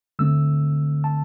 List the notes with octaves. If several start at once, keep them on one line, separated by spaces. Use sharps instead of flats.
D3 A3 C4 E6
A5